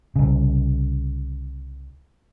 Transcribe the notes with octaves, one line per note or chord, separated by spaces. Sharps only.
C2 C#3